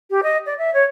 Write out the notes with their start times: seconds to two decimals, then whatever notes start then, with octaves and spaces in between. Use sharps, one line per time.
0.10 G4
0.23 D#5
0.46 D5
0.58 E5
0.73 C#5